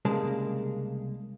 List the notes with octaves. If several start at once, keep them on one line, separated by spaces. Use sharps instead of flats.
C2 C#3 G#3 A#3 A5